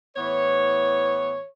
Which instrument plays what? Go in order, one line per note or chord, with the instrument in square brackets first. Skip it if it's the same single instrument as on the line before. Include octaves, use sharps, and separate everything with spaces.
[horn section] A2 E3 B3 C#5